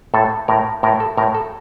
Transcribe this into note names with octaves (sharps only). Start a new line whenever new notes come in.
A2 A4
A2 A#4
A2 A#4
A4
A2 A#4
A4